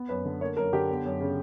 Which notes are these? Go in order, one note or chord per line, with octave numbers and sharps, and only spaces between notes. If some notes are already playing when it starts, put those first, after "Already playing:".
Already playing: B3
F#2 B4
D3
A#3 C#5
F#2 A#4
D3 G4
B3
F#2
C#3